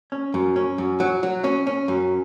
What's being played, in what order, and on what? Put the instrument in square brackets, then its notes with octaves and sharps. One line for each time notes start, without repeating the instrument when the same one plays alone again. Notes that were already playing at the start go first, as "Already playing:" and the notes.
[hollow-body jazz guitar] C#4
F#2
C#4
F#2
F#3
F#3
C#4
C#4
F#2